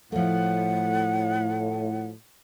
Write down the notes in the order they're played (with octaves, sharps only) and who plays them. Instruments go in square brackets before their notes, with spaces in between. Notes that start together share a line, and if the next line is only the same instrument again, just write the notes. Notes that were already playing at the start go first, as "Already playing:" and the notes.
[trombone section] A2 [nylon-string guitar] F3 A3 [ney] F#5